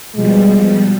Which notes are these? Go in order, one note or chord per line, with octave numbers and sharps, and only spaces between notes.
B2 F3 G3 G#3